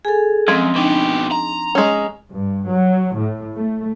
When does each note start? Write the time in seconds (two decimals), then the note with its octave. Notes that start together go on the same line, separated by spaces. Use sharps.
0.05 G#4 A4 G#5
0.48 F#2 F3 G#3 C4 C6
0.76 B2 D4 D#4 G4
1.32 A#5
1.75 G#3 C#4
2.34 G2
2.69 F#3
3.17 A2
3.56 A3